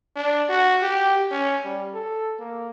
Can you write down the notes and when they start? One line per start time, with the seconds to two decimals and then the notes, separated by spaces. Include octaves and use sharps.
0.16 D4
0.49 F#4
0.82 G4
1.31 C#4
1.64 G3
1.94 A4
2.39 A#3